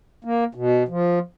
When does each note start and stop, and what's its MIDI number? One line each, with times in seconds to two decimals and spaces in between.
0.24 0.44 58
0.55 0.83 47
0.88 1.19 53